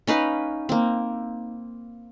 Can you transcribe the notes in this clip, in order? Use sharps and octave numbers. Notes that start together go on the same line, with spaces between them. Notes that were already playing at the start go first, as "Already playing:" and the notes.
C#4 D#4 B4 F5
A#3 C4